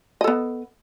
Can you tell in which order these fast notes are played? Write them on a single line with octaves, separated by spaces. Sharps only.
D#5 A4 B3